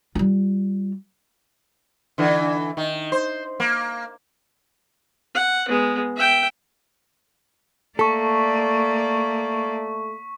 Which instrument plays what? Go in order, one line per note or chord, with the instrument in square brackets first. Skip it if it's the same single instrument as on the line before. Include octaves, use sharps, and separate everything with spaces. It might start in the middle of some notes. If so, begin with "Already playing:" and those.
[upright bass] G3 F4
[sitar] D3 E3
D#3
C5
A#3
[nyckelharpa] F#5
G#3 B3
E5 G5
[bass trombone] A3 [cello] A#3 D5 [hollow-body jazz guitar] A4 [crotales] C#6 B6